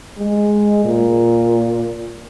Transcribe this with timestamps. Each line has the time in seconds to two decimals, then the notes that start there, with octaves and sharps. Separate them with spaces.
0.18 G#3
0.85 A#2